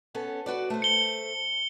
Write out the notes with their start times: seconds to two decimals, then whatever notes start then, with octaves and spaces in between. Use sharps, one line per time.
0.15 B3 C#4 A4
0.46 F#4 B4 D5
0.70 A3 C5
0.82 C#7 G7